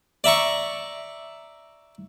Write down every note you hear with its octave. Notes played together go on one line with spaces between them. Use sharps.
D5 E5 A#5 C#6